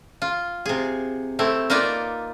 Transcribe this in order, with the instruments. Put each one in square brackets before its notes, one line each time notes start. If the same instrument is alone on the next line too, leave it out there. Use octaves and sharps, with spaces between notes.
[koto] F4
C3 G#4
A3 C4 E4
A#3 D#4 F4 B4 D5